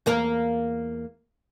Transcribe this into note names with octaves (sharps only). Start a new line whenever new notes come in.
E2 A#3 A#4